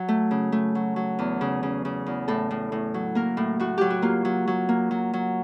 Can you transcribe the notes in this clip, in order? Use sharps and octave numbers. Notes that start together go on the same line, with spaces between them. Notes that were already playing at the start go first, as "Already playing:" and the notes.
Already playing: F#3
A3
C#3
A3
F#3
F#3
E2
C#3
C#3
C#3
E2
A2 A4
A2
A2
F#3
A#3 A#4
A2
A2 F#4
F#3 G4
F#4
A#3 F4
F#3
F#3
A#3
F#3
F#3